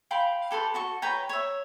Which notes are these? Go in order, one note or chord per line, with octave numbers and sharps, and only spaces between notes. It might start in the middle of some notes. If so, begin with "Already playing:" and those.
F5 G5 B5 C6
G4 A4 B4 C6
F#4 A4 C#6
B4 C#5 G5 A#5
C#5 E5